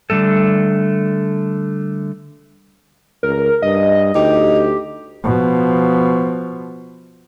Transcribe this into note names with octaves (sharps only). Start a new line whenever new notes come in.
D3 G3 A3 A4
C#2 A#4
G2 D#5
D2 D#4 G4
B2 F3